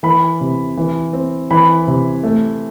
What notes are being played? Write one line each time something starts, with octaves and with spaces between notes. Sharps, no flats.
E3 B5
C3
E3
C4
E3 B5
C3
A3